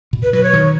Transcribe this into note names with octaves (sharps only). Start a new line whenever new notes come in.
B2
B4
F#3 B4
C#5
D#3